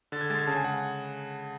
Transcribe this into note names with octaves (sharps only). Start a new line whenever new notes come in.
D3 A6
G#6
G#3 A6
G#6
C#3 A5
G#5
F#5